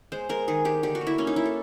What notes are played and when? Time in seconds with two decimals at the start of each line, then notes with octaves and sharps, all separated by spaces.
0.12 G#3 C5
0.29 G#3 A#4
0.48 D#3 G#4
0.65 G#3 G4
0.83 D3 G4
0.95 F#4
1.01 A#3
1.07 E4
1.18 A#3 C#4
1.27 D#4
1.36 A#3 E4
1.45 A4